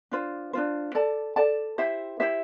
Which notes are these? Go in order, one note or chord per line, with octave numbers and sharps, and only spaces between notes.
D4 F4 C5
D4 F4 C5
A4 D5 A5
A4 D5 A5
E4 G4 C5 E5
E4 G4 C5 E5